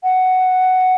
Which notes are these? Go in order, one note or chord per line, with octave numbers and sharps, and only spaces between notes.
F#5